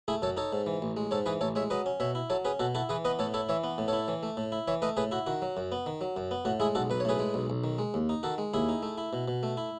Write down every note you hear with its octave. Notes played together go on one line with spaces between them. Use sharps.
A3 E4 G#4
F#2 A4 C#5
D#4 A4 C#5
G#2
E3
A1
G#3
G#2 A4 C#5
E3 G#4 B4
A1 A4 C#5
G#3 C#5 E5
F#3 B4 D#5
C#4
B2 C#5 E5
E4
F#3 A4 C#5
C#4 G#4 B4
B2 F#4 A4
E4 F#4 A4
E3 G#4 B4
B3 B4 D#5
A2 A4 C#5
E4 A4 C#5
E3 C#5 E5
B3
A2
E4 A4 C#5
E3
A3
A2
E4
E3 C#5 E5
A3 B4 D#5
A2 G#4 B4
E4 F#4
D#3 F#4
F#3
F#2
B3
D#3
F#3
F#2
B3
A2 F#4
G#3 E4 G#4
B1 F#4 A4
B1 B4
C#5
A2 G#4 B4
G#3
B1
B1
D#3
G#3
D#2
D#4
D#3 F#4 A4
G#3
D#2 E4 G#4
D#4
A3
E4
B2
B2
A3
E4